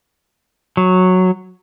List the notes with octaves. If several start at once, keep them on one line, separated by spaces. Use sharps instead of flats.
F#3